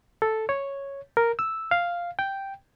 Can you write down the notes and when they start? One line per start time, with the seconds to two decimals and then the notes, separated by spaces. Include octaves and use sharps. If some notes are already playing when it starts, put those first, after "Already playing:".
0.22 A4
0.49 C#5
1.17 A#4
1.39 E6
1.71 F5
2.19 G5